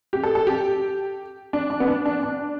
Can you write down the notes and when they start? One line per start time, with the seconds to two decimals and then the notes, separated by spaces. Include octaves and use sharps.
0.13 G4
0.23 A4
0.35 A4
0.47 G4
1.53 D4
1.70 D4
1.80 B3
1.88 D4
2.06 D4
2.23 D4